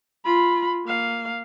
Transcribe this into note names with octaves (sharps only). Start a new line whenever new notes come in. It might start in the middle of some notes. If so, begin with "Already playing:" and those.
F4 B5
A#3 F5